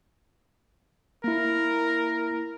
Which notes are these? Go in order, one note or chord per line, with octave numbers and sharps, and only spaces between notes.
A#3 E4 A#4